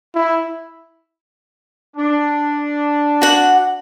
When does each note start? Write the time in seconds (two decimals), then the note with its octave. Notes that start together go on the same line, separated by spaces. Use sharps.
0.15 E4
1.96 D4
3.22 F#4 F#5